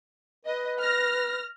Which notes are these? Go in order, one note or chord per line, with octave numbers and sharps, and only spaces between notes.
B4 D#5
F6 A#6